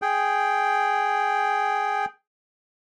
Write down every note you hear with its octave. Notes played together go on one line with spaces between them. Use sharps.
G#4 G5